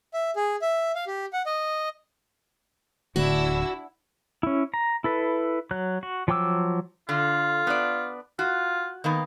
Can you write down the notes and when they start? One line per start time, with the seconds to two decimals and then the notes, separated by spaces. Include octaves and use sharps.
0.14 E5
0.36 G#4
0.62 E5
0.95 F5
1.07 G4
1.33 F#5
1.46 D#5
3.16 D1 D2 D4 E4 F#4 E6
4.43 C#4 E4
4.74 A#5
5.04 E4 A4 B4
5.71 F#3 F#6
6.03 F#4
6.28 F3 F#3 G5 D6 E6
7.09 D3 F4
7.67 B3 D4 D5
8.39 F4 F#4
9.04 D#3 A#3 B3